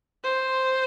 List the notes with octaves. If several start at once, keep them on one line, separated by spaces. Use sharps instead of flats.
C5